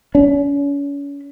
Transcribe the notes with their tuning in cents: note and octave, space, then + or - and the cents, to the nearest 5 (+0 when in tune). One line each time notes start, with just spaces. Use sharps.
C#4 +35